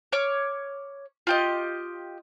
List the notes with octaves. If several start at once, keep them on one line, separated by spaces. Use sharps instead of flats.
C#5 D6 F6
F4 G4 D#5